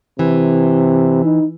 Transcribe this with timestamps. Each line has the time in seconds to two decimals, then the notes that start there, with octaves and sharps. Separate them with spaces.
0.19 C3 E3
1.24 D#4